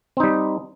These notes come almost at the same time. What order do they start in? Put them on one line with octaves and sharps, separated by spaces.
C4 D#4 G3